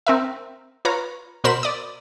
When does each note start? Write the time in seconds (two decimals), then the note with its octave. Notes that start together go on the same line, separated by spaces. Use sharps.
0.07 C4 A#4 E5
0.85 F4 B4 C#5 A#5
1.44 B2 A#4 C5 B5 E7
1.63 D5 D#6